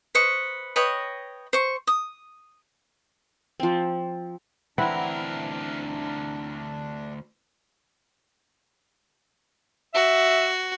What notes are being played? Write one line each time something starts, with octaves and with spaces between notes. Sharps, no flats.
B4 C5 D#5 C#6
B4 C#5 D#5 G5
C5 C#6
D#6
F3 C4
D2 E3 C4 D4 E4 A#4 F#5 B5
F#4 E5